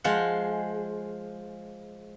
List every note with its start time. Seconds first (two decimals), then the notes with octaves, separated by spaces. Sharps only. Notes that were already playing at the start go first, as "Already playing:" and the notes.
0.04 F3 G#3 F4 F#5